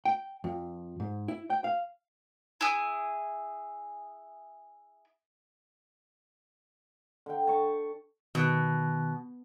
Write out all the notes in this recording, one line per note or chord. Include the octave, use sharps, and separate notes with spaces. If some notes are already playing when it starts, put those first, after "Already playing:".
G5
F2
G#2
E4
G5
F5
E4 G#4
D3 G5
A5 C#6
B2 D#3 F#6